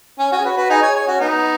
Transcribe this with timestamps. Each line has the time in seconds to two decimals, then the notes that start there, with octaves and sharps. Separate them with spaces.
0.19 C#4
0.32 C#4 F#4
0.38 G#4
0.45 F#4 B4
0.57 F#4 B4
0.70 D#4 G#4
0.82 G#4 C#5
0.95 G#4 C#5
1.07 C#4 F#4
1.20 B3 D#4